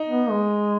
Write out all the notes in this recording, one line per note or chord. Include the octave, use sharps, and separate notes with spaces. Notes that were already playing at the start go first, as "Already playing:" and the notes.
Already playing: D#4
B3
G#3